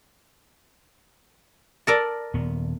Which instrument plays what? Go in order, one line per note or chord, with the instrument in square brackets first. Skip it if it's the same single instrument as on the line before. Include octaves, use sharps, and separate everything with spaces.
[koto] A4 A#4 D5
[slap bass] D#1 B3